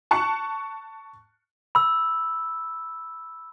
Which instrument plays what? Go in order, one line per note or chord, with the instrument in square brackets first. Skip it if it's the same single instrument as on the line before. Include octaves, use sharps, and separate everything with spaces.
[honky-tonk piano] A5 C#6 F#6 C#7
[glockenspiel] B5 E6